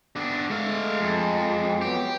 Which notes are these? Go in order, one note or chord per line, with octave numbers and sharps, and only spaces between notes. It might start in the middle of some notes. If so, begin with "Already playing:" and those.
B3 D4
G#3 A3 F5
F2
F#3 B3 G4